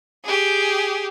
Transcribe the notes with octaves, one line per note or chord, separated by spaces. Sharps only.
G4 G#4